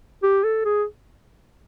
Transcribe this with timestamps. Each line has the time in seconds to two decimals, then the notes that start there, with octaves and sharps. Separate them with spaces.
0.23 G4
0.44 A4
0.65 G#4